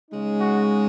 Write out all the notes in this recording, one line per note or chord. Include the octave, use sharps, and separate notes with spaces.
C#3 G#3 D#4
F#4